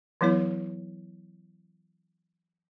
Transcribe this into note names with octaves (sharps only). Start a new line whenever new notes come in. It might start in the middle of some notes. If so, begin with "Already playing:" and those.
E3 F#3 B3 E4 C#5